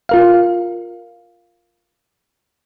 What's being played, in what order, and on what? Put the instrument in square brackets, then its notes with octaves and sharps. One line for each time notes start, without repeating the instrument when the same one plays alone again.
[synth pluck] F4 A#4 F5